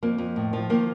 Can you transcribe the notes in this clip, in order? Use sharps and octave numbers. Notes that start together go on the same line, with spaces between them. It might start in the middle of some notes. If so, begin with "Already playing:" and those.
F2 A#3
F2
A2
F3
D#3 A#3